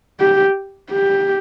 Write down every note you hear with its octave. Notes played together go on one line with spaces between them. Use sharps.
G4
G4